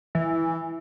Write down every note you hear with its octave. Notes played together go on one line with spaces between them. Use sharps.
E3